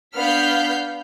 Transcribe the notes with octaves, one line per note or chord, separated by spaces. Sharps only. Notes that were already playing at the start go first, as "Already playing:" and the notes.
B3 D4 F5 F6 G6 B6